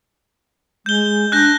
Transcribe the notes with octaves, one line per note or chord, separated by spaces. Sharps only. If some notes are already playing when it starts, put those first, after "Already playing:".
G#3 G6 G7
D4 F#6 G6 A#6